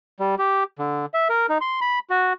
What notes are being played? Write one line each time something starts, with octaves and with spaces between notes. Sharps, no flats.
G3
G4
D3
E5
A#4
D#4
C6
B5
F#4